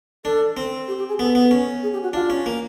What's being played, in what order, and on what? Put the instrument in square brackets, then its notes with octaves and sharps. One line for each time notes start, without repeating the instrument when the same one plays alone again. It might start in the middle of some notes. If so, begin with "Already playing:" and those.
[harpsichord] D4 [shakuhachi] A4
[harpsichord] C4
[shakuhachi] G4
G4
G#4
[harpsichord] B3 [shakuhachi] A4
[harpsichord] B3
C#4
[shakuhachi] G#4
G4
F#4
[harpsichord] D4 [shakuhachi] F4
[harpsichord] C#4
A#3